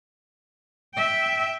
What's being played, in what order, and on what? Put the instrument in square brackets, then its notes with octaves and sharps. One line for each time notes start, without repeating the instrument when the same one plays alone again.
[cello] E5 G5